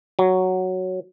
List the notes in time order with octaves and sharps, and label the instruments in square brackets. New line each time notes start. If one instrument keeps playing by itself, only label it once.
[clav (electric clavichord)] F#3